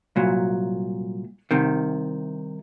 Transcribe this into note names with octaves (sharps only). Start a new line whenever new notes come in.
C2 A#2 F#3
C2 C3 D#3